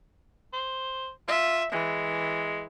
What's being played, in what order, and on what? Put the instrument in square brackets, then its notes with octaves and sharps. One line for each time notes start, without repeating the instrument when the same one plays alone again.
[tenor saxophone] C5
[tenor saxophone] F4 [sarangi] E5
[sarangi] E3 [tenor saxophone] G#3